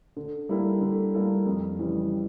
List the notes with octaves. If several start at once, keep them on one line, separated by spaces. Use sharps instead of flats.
D3
G3 A#3 E4 A4
D3
G3 A#3 E4 A4
F2
C#3 E3 G3